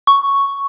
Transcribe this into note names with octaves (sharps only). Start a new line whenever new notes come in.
C#6